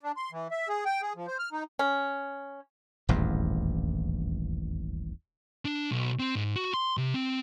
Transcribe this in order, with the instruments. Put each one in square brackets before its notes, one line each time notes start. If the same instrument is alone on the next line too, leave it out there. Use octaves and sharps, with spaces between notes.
[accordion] D4
C6
E3
E5
G#4
G5
G#4
F3
C5
F6
D#4
[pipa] C#4
[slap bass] D#1 A1 E2 G2
[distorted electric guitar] D4
B1
C4
G#2
F#4
C6
C3
C4